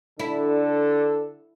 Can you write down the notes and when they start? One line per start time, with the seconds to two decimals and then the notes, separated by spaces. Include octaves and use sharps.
0.19 D3 D4 E4 A4